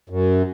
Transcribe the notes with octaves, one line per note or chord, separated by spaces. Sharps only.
F#2